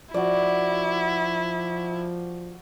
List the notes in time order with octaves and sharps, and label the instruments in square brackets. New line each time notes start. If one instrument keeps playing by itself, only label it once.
[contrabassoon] F3 [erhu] E4 [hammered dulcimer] F#4 D5